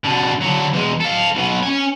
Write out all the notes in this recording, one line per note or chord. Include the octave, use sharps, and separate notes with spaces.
B2 D3
D3 F#3
E2 G#3
A4 F5
B1 B2
C#4 G#5